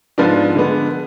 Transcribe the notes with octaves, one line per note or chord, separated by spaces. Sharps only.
G#2 F3 B3 D4
D3 G#3 B3